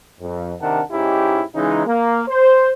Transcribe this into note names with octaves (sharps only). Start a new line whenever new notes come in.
F2
C3 D#3 D4 A#4 F#5 A5
G#2 C#4 D#4 E4 G4
C#3 E3 G#3 C#4 D#4
A#3
C5